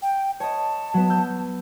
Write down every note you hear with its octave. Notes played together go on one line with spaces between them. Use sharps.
G5
C#5 D#5 A5
F#3 B3
E6 G6